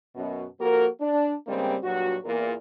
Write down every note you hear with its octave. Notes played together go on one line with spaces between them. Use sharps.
F#2 B2
F3 A#3 F#4 A4 A#4
D4
G2 C#3 G3 G#3 A#3 C4
G2 A#2 F#3 F#4
E2 A#2 A#4